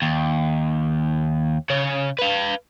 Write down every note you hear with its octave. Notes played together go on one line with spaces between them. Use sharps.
D#2
C#3 C#5
B4 F5